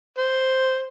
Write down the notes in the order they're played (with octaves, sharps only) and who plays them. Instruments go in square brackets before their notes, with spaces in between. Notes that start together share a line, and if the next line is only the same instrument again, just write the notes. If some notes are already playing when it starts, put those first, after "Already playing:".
[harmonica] C5